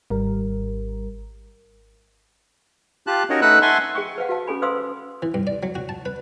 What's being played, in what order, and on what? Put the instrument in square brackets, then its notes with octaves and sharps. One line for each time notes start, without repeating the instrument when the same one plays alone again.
[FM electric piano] G#1 G3 A#4
[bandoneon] F4 G4 A5 F#6
C#4 D#4 F#4 A#4 C#5 D#5
A3 D#4 B4 F#5 E6 F#6
E5 F#5 G#5 A5 C6 C#6
[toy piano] G#4 G5 C#6
B4 C5 F5 F#5
F#4 B4 F5 A5
C#4 G#4 A4 G#5 B5
B4 C5 F5 C6 D#6 E6
B4
[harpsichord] E3
G2
D5
F#3
F#4
A5
B4